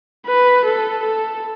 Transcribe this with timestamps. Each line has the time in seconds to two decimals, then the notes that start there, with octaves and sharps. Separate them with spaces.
0.26 B4
0.65 A4
1.03 A4